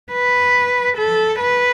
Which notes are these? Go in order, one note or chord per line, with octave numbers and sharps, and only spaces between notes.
B4
A4
B4